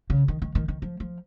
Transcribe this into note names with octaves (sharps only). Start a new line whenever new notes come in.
C#3
D#3
D#3
D#3
D#3
F3
F3